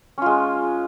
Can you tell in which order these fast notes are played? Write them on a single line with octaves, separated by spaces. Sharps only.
C#4 F4 G#3